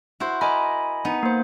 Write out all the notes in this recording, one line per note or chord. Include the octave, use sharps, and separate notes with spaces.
E4 F#4 C5
A#4 D#5 G#5 B5
B3 D#4
A#3 C5